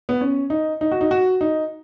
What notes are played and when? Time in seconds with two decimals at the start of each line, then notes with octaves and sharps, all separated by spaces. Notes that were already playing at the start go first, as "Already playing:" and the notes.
0.09 B3
0.21 C#4
0.50 D#4
0.81 D#4
0.92 F#4
1.01 D#4
1.11 F#4
1.41 D#4